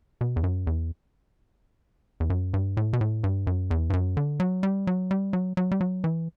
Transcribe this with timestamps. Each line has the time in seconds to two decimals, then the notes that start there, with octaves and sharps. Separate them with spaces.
0.21 B2
0.36 E2
0.44 F#2
0.67 E2
2.20 E2
2.30 F#2
2.54 G2
2.77 A2
2.93 B2
3.01 A2
3.24 G2
3.47 F#2
3.71 E2
3.90 G2
3.93 F#2
4.17 D3
4.40 F#3
4.63 G3
4.87 F#3
5.11 G3
5.33 F#3
5.57 F#3
5.71 G3
5.81 F#3
6.04 E3